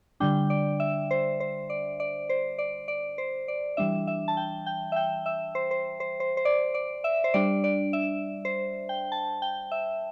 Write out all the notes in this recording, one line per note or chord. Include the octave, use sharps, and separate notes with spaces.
D3 G3 D4 G5
D5
E5
C5
C5
D5
D5
C5
D5
D5
C5
D5
E3 G3 D4 E5
E5
A5
G5
G5
E5
G5
E5
C5
C5
C5
C5
C5
D5
D5
E5
C5
G3 D4 D5
D5
E5
C5
G5
A5
G5
E5